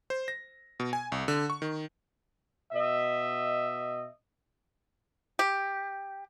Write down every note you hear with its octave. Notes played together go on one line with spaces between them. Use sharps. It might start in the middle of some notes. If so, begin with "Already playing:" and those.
C5
A#6
B2
G#5
C2
D3
C#6
D#3
B2 D#5 E5
G4